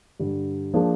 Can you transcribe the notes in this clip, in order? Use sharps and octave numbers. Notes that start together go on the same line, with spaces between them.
G2 D3 G3
F3 A#3 D4 G#4